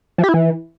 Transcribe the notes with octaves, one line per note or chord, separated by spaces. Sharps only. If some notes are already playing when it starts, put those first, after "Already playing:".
F3
G4
E4
E3